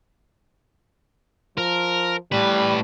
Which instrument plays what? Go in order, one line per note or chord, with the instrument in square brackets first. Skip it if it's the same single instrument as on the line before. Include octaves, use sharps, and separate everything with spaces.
[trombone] F3 [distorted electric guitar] A#4
[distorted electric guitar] A2 B4 [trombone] G3